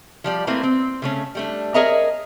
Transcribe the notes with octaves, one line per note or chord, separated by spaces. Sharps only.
F3 G3 D5
A3 A#3 C4 E4 B4
C4
C#3 A3 C#4
G3 A3 D4
G#4 A#4 C#5 D#5 E5 A#5